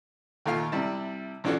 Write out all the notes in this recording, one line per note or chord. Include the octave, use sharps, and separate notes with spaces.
D#2 A#2 A3 F4 F5 F6
C3 G3 E4 A5
A1 C#4 D4 F4 F#4 A4